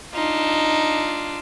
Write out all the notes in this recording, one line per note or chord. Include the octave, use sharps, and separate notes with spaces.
D4 D#4 F4